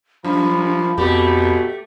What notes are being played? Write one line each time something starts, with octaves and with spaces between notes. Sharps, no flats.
F#2 F3 B5
F2 B2 A3 G4